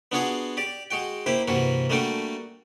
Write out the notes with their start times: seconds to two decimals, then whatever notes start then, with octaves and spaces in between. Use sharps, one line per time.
0.12 B3 D4 F4 F#4 G#4 F5
0.57 G4 D5
0.91 G#3 F#4 G5
1.26 A#3 E4 G4 C5 G5
1.48 G2 C3 E3 A#3 F#4
1.89 G3 A3 A#3 D4 F#4 G5